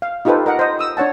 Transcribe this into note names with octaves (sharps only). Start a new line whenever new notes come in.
F5
D#4 F4 G4 A4 B4 C5
A#4 D#5 F#5
C5 D#5
D#6 E6
D4 C#5 F#5 A5